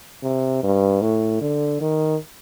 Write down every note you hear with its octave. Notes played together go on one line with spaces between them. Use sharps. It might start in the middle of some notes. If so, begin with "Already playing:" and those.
C3
G2
A2
D3
D#3